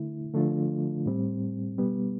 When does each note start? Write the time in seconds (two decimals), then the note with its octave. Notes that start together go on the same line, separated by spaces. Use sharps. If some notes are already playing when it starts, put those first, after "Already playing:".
Already playing: D3 A3 E4
0.34 D3 F3 A3 D4 F4
1.06 A2 G3 C4
1.78 B2 G3 B3